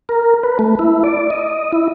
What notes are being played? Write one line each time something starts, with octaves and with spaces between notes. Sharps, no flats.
A#4
B4
A3
E4
D5
D#5
E4